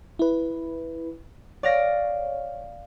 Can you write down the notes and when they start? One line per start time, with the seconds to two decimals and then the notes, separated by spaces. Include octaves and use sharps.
0.19 E4 B4
1.63 C#5 D5 F5 A#6